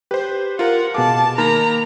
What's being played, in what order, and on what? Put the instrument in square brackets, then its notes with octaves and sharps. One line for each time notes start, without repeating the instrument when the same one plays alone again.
[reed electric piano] G4 [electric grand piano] B4 C5
[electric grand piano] F4 A#4 [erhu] F#5
[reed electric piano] B2 G#4 F5 [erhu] A5 [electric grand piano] D6
[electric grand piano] D#3 A#3 [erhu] A#5 [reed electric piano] B5